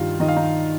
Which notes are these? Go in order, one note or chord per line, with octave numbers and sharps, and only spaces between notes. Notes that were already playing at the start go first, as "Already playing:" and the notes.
Already playing: G2 D#3 D#4 F4 F5
D#3 D#5
F5
D#4 D#5